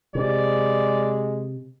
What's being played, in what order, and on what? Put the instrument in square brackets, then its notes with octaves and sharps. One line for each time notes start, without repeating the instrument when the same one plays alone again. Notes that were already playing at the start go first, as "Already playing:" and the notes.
[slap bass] C3 [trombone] G#3 [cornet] D5